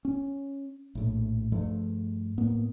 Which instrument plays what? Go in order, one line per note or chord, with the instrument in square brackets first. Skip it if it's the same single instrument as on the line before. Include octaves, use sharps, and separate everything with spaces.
[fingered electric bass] C#4
A#1 A2
G2 F3 A3
A2 A#3 B3